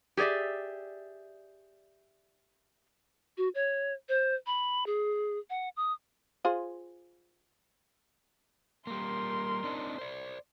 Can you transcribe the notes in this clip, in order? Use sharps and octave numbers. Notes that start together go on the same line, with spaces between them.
G4 G#4 C#5 D5 E5
F#4
C#5
C5
B5
G#4
F#5
D#6
F4 G#4 C5
G3 A#3 A#4 C6
C4 D4 D#4
C5 D5